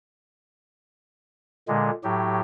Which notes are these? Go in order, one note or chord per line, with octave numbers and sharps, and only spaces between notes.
A#2 D3 G#3
A2 F#3 G4